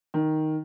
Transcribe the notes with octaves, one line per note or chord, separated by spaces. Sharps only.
D#3